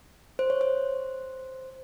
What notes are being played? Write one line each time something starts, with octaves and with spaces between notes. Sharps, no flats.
C5
C#5
C5